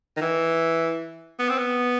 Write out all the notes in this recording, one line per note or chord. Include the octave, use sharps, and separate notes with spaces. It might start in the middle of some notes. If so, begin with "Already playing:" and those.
D#3
E3
B3
C4
B3